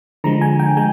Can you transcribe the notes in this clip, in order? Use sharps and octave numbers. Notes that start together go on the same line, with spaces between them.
D3 F3 G#3 A#5
G#5
G5
G#3 G#5